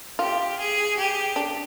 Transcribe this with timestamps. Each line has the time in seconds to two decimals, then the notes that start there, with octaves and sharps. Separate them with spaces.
0.19 F4 G4
0.58 G#4
0.97 G4
1.36 D4